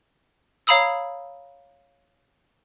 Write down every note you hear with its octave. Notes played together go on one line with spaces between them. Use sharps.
C#5 F5 A#5 B5 D#6 E6